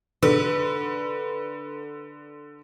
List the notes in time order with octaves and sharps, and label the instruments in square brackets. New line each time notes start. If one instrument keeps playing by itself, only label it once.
[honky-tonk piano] D3 [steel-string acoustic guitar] B4